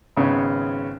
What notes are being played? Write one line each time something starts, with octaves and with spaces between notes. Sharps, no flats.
G#1 C#3 B3 C#4